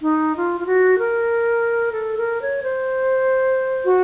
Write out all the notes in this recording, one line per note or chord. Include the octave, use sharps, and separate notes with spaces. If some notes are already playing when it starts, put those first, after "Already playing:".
D#4
F4
F4
F#4
A#4
A4
A#4
C#5
C5
F#4